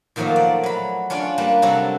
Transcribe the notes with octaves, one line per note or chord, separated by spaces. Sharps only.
A#2 D#3 F3 F#3 A3 A#3
D5
F#3 B5
C#4 D4 F4 D5
G3 A#3 B4
C3 F#3 G3 F#4 A4